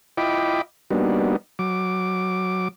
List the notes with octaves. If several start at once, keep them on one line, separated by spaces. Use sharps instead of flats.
E4 F4 D#5 G5 B5 D6
G3 A#3 B3 D4 D#4 F#4
F#3 D6